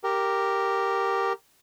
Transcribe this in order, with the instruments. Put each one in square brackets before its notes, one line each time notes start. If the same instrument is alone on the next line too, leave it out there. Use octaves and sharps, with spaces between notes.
[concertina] G4 A#4